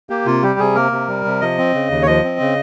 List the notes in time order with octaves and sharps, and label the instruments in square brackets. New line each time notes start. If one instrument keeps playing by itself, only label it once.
[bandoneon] A#3 G4
C3 F4
G3 G4
C3 G#4
A#3 A#4
C3
G3
C3
F3 D#5
C4
C#3
D#2
C#5
F3 D#5
C4
C#3